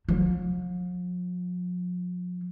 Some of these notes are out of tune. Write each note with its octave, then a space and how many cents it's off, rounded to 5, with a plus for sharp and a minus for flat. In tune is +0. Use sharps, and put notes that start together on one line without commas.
F3 +45